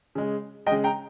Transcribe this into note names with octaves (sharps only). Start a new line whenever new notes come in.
C#3 G#3
C#3 G#3 D#5 G5
G5 A#5